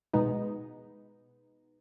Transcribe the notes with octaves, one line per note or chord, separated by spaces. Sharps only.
B2 G#3 B3 D#4